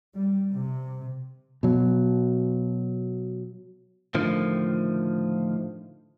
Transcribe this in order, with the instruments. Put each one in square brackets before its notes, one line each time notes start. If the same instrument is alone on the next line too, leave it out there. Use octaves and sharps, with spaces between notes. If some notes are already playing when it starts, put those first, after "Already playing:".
[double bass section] G3
C3
[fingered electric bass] B2 F#3
[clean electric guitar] A2 D3 D#3 F3